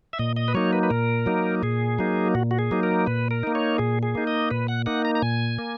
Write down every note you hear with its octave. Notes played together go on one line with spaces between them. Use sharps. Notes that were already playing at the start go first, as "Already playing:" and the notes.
E5
A#2 D#5
D#5
B4
F#3 A#3 D#4 C#5
B4
B4
A#2 A#4
F#3 A#3 D#4
A#2 G#4
F#3 A#3 D#4
A#2 F#4
F#4
G#4
F#3 A#3 D#4
A#4
A#2 B4
A#4
A#3 D#4
C#5
A#2 G#4
G#4
A#3 D#4
D#5
A#2 B4
F#5
A#3 D#4 F#5
A#5
A#5
A#2 G#5
A#3